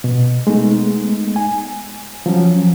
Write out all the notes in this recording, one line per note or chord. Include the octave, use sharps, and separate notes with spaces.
B2
G#3 A3 B3 D#4
G#5
F3 F#3 C#4